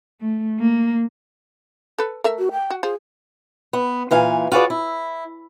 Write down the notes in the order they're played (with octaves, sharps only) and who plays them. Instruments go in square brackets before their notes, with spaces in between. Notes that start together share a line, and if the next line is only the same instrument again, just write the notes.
[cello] A3
A#3
[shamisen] A4 B4
A3 A#4 E5
[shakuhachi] F#4
G5
[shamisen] F#4
[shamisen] F4 C5 [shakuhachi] G#4
[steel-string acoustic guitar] B3
A#2 E3 F5 G#5
F4 F#4 G#4 B4 D5
E4